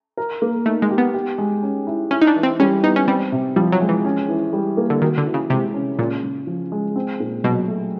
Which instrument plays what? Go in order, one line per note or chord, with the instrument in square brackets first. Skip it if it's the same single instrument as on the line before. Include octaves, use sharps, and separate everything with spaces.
[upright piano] A#4
A#3
[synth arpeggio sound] A3 [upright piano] D#4
[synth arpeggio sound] G#3
[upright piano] G4
[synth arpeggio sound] B3
[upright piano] G4
G#3
C#4
E4
[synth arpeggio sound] C#4 [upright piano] E4
[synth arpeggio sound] D#4
D4
[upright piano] E3
[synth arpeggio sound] C4
[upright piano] G3 [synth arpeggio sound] C#4
[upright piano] B3 [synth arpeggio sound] D#4
[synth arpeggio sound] C#4
[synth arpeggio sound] G3 [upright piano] C4
[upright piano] C3
[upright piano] F3 [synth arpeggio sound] G3
[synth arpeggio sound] F#3
[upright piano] G#3
[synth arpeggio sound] E3
[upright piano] C#4
E3
G3
A#3
[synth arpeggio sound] D3
[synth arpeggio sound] D#3 [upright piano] F#4
[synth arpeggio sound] D3
[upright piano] E3
[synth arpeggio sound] C#3
[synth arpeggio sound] C3 [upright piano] G#3
[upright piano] C#4
[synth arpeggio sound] A#2 [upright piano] C#3
[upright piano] C#3
F3
G#3
C4
A#2
[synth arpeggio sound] B2 [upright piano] F#3
[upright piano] A3